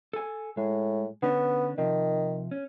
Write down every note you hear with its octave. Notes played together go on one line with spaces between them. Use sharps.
A4 G#5
A2 G#3
D3 B3 C#4 D4
C3 D#3 F3
C#4